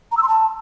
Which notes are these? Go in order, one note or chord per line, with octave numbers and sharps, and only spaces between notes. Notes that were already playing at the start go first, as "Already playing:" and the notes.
A#5
E6
C6
A5